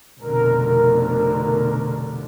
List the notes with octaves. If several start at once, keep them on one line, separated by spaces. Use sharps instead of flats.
F1 B2 D3 A#4